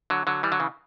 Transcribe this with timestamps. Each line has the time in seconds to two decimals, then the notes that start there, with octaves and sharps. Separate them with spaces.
0.10 D3 F#3
0.27 D3 F#3
0.43 E3 G3
0.52 D3 F#3
0.60 C#3 E3